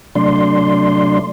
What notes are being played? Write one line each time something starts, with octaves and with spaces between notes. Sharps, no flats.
C3 F#3 A3 D4 D5 C6